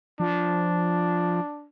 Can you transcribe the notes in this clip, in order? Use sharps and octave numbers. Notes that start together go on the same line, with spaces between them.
F3 D4